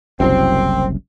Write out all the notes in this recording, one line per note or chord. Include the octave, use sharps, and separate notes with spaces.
F#1 C2 F#2 C4